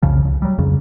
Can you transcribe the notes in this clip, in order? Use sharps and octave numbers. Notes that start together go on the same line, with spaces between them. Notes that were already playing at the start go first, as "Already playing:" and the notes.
C2 F2 C#3 F3
C#2
F#3 G3
F2 C#3